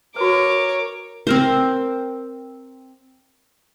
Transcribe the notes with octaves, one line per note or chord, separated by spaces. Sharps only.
F#4 A#4 B4 C#5 D6
C4 A#4 C5